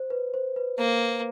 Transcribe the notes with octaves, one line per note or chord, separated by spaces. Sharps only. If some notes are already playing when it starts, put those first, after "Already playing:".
Already playing: C5
B4
C5
B4
A#3 C5